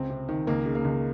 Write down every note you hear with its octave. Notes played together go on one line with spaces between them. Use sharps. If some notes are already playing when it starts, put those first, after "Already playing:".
Already playing: C#2 C4
C3
D#3
C#2 A#3
C#3
A#3
C#2